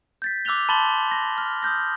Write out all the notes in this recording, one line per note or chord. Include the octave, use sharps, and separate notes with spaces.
G6 A6 B6
D6 E6 F#6 A6 F7 G7
A5 B5 C6 A6 F#7 G7
A#6
A5 F6
D#6 F6 G6 A#6